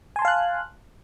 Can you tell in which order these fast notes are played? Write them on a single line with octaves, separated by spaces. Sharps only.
G#5 C6 A5 F5 F#6